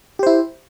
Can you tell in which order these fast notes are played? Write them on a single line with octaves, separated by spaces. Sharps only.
G4 C5 E4